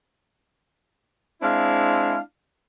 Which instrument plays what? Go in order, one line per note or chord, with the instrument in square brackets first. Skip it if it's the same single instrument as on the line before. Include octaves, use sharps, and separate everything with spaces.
[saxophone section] G#3 C4 D4 E4 F5